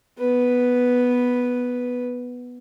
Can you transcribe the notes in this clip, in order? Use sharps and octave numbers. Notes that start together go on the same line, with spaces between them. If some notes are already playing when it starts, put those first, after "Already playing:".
B3 B4